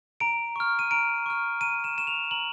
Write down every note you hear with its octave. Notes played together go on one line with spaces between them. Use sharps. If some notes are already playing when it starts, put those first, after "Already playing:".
A#5 D7
C#6 F6
D#7
A#5 D7
C#6 F6
A#5 D#7
E7
C#6 F6 E7
F7
A#5 F#7